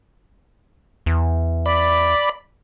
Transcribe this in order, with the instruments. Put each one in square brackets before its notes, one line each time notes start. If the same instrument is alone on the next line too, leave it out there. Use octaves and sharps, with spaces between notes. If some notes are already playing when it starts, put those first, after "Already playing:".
[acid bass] E2
[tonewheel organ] D5 B5